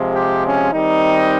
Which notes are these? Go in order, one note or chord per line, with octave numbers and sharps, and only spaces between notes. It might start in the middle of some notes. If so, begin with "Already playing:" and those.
Already playing: C3 F3 G#3
G4
C#4
D#3 G3 C4 D#4